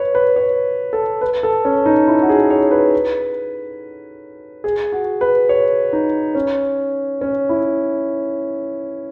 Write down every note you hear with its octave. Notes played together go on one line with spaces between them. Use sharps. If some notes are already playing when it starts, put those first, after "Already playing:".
Already playing: B4 C#5
B4
C#5
A4
B4
A4
C#4
D#4
E4
F#4
G#4
C#5
B4
G#4
F#4
B4
C#5
D#4
C#4
C#4
E4